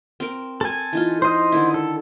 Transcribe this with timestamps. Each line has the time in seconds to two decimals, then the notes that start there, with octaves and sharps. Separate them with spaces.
0.20 C4 A#4
0.61 A4 G#5
0.93 E3 D#4 F4
1.22 C5 D#5
1.52 D3 D#3 E4
1.74 A4